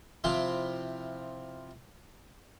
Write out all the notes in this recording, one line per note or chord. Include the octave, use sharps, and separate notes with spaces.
C3 F3 C4 E4 C5